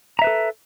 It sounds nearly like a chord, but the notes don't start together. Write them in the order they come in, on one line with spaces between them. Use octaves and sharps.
A#5 E5 B4 A4